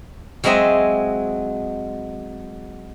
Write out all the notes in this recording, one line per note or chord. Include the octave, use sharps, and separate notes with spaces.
F#3 G#3 C4 D#5 E5